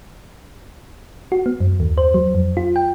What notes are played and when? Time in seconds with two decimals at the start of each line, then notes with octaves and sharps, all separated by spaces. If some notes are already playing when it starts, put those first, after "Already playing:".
1.32 F#4
1.46 B3
1.60 F#2
1.80 D#2
1.98 C5
2.14 F#3
2.35 F2
2.57 F4
2.76 G5